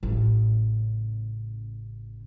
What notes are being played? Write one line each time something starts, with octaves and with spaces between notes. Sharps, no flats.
A1 C#3